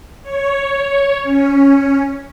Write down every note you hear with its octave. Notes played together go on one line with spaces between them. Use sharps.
C#5
C#4